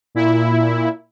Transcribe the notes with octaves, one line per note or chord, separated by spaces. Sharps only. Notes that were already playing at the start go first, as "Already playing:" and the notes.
A#2 E4